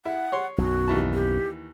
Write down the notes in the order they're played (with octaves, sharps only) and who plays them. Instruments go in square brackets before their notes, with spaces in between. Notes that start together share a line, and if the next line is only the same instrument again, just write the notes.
[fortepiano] E4 [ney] F#5
[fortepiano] C#5 C6
[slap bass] B1 F#2 [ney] F#4
[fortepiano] D#2 E3 A5
[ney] G4